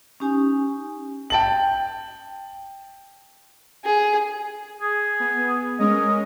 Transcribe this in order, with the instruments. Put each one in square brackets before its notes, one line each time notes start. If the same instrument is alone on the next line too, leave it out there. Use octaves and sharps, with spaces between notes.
[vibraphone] C#4 D#4 G4 G#5
[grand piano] G5 A5 F#7
[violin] G#4
[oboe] G#4
[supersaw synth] B3
[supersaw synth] G#3 C#4 A#4 [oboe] D#5